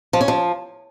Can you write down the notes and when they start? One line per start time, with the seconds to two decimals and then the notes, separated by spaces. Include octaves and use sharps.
0.13 F3
0.21 C#4
0.28 F3